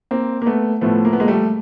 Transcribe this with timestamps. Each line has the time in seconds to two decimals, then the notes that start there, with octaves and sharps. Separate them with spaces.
0.11 A#3 C4
0.42 A#3
0.46 A3 B3
0.81 A2 F3 A3 B3
1.05 A#3
1.13 B3
1.20 G#3 A#3
1.28 G3 A3